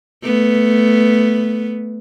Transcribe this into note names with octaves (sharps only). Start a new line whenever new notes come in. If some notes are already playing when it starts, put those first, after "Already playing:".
A3 B3